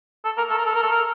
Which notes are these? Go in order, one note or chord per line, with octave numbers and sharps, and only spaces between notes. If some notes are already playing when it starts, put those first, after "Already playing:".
A4
A#4
A4
A#4
A4
A#4
A4
A#4